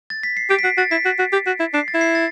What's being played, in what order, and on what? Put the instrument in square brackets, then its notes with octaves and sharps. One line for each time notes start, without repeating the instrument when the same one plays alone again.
[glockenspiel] A6
B6
C7
[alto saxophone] G4 [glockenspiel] D7
[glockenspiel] B6
[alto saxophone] F#4 [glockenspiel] C7
[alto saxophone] F#4 [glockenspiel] A6
[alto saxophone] E4 [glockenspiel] B6
[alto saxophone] F#4
F#4
G4
F#4
E4
[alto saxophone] D4 [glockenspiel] C7
[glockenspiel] A6
[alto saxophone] E4
[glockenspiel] C7
A6